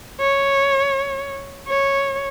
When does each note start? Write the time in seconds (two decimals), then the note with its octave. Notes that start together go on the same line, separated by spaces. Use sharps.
0.20 C#5
1.68 C#5